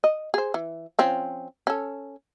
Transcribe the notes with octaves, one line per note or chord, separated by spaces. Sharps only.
D#5
G#4 C5
E3
F3 C4 C#4
C#4 A4